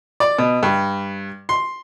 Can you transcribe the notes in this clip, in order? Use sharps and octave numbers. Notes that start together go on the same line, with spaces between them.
D5
B2
G2
C6